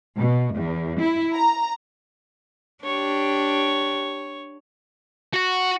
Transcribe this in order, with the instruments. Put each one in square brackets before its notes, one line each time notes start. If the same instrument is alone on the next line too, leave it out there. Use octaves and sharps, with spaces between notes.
[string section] B2
E2
E4
A#5
[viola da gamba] D4 G4 [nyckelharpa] C#5
[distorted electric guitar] F#4